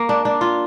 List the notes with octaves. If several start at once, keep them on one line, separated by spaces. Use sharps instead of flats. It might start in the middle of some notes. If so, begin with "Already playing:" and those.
Already playing: A#3
D4
D4
F4